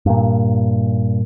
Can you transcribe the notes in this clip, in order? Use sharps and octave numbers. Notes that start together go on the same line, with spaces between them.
G2 A#2